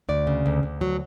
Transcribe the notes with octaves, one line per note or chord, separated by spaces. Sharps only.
D2 D5
C#3
D2
D2
F#3